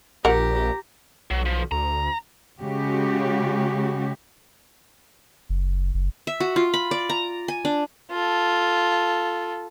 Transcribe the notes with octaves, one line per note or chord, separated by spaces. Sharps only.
A#1 G4 A#4 F#5 A#5
B1 F#3
F3
D2 A#5
C#3 G#3 F#4 G4
F#1
F#1
E5
F#4
F4
B5
D5
A#5
G#5
D4
F4 A4